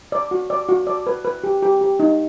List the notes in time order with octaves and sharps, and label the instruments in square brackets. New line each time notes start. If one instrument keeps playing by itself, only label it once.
[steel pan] D5
F#4
D5
F#4
D5
B4
B4
G4
G4
G4
D#4